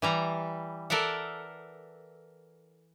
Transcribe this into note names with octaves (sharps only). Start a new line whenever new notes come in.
E3 G3 A#5
A4 A#4 D5 E5 F#5